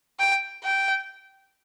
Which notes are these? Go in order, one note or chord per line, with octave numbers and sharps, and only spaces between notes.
G5
G5